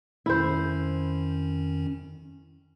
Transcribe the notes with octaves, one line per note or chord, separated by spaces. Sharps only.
F2 D#3 C#4 E4 C5